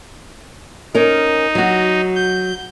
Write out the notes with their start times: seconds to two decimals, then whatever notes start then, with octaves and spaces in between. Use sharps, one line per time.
0.95 C#4 D#4 A#4
1.55 F#3 F#4
2.15 G6